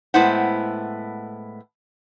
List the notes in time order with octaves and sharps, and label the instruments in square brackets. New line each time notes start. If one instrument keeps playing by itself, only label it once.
[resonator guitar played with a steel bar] A2 G#3 B3 E4 C5 F#5